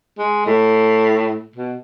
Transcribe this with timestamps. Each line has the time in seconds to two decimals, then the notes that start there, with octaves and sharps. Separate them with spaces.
0.18 G#3
0.46 A2
1.55 B2